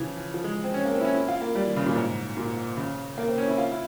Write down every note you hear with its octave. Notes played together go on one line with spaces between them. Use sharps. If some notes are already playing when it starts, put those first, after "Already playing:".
Already playing: C#3 E3 F3
F3
G#3
C4
C#4
A#3
C4
E4
C#4
E4
F4
A#3
G3
E3
C#3
A#2
G#2
A#2
C#3
A#3
C4
C#4
E4
F4
E4